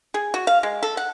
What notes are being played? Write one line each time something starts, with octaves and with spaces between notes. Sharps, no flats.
G#4
F#4
F5
G#3
A4
F#5